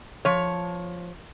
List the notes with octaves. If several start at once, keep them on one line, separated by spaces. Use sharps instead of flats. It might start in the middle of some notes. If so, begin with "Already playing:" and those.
F3 C#5